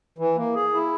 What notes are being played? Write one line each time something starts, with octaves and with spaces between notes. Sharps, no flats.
E3
A#3
G#4
E4